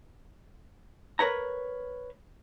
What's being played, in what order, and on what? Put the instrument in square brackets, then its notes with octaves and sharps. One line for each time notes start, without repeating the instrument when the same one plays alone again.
[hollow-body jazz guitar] A#4 B4 C#5 A#5